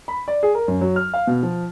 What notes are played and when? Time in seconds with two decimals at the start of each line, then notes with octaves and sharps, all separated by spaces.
0.08 B5
0.28 D5
0.43 G#4
0.55 A#4
0.68 F#2
0.81 F#3
0.96 F6
1.14 F5
1.27 B2
1.43 F3